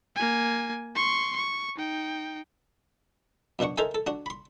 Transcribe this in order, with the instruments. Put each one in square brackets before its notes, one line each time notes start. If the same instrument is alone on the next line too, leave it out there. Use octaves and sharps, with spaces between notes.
[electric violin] A#3 G#5
C6 C#6
C#6
D#4 G5
[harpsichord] F#2 B2 D4 F#4 C#6
D#4 A4 A#4 C5 E5 G#5
A4
D4 F#4
B5 C6